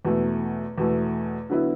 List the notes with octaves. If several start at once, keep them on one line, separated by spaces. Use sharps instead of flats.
E2 B2 A3
E2 B2 A3
D3 F#3 B3 E4